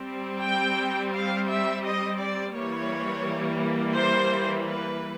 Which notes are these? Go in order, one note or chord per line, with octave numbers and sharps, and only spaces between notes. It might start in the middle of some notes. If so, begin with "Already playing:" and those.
Already playing: G3 C4
G5
F5
E5
D#5
D5
E3 G3 A#3 C#5
C5
B4